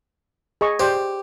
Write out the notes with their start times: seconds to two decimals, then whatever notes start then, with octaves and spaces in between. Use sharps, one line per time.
0.61 G#4 D#5 C#6
0.80 G4 C5 D5